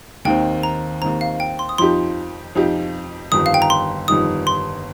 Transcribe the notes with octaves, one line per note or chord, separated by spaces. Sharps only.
D#2 D#3 C4 G5
A#5
D#2 D#3 C4 A#5
F5
G5
C6
D#6
F2 F3 D#4 G4 C6
F2 F3 D#4 G4
G1 F2 D#3 G3 D#4 D#6
F5
G5
A#5
C6
G1 F2 D#3 G3 D#4 D#6
C6